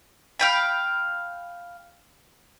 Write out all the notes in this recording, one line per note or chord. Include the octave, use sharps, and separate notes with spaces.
F5 G5 B5